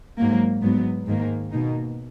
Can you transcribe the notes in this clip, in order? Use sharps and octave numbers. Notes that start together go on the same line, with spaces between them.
G#2 F#3 A#3
G#2 F#3 B3
G#2 D#3 A#3
B2 A#3 D#4